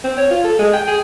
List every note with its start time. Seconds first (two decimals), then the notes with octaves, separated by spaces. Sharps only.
0.04 C4
0.18 C#5
0.30 F4
0.44 A4
0.59 G#3
0.73 G5
0.87 G#4